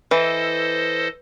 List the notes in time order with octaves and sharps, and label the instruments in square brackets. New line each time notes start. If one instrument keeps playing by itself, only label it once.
[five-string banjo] E3 [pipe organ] A4 C5 D#5